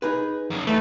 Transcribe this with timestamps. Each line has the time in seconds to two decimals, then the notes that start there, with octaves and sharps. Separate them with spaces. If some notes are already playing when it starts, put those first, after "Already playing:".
0.02 D#4 G#4 B4
0.50 F#2 C#3
0.67 E2 E3 A3 D#4 B4